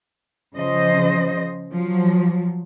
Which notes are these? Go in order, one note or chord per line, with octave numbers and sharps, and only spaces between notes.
C#3 F3 C5 D#5
F3 F#3